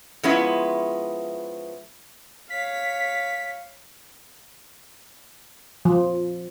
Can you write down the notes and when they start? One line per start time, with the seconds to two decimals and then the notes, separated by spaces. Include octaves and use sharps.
0.23 F3 G#3 B3 C#4 E4
2.50 C#5 F5 B6
5.85 F3